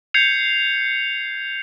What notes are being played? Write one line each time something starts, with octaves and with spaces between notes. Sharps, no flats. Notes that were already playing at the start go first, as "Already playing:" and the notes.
G6 G#6 C7 C#7 F7